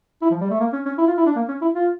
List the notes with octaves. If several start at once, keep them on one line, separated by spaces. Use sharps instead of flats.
E4
F3
G3
A3
A#3
C#4
C#4
E4
F4
E4
D4
A#3
C#4
E4
F4